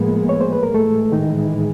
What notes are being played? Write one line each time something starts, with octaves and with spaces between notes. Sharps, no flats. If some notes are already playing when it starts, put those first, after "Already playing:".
Already playing: A2 F3 G#3 A#3 B3 A#4
C#5
C5
B4
A#4
A2 E3 G#3 A3 A4
D#3 D#4